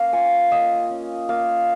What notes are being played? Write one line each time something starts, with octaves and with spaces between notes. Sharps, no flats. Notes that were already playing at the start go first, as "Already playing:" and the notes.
Already playing: A#3 C#4 F5
F4 G#5
A#3 D#5
C#4
A#3 F5